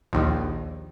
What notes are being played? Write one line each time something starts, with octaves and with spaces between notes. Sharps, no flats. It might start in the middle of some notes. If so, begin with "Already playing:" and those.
A#1 D#2